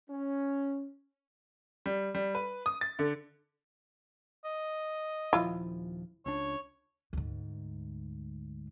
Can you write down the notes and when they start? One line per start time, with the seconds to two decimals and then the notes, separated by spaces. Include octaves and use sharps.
0.10 C#4
1.86 G3
2.15 G3
2.35 B4
2.66 D#6
2.81 A6
2.99 D3
4.45 D#5
5.33 D#1 F3 E4 F4
6.26 C#2 D4 C#5
7.13 D2 G#2